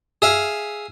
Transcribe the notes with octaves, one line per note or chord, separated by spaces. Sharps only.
G#4 E5 F5